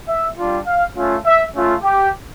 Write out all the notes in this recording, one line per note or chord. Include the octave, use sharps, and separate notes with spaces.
E5
G3 D4 F4
F5
A3 C#4 F4
E5
A3 C#4 F4
G4